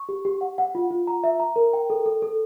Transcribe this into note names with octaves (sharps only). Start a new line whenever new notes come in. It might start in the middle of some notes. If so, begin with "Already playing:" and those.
Already playing: C#6
G4
G4
F#5
F#5
F4
F4
A#5
E5
A#5
A#4
G5
A4
A4
A4